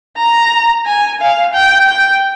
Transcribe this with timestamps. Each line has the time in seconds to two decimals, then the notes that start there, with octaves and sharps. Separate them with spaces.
0.18 A#5
0.86 G#5
1.21 F5
1.54 G5
1.88 G5